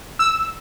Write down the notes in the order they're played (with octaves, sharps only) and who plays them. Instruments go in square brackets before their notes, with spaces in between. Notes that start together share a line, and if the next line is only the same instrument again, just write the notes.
[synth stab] E6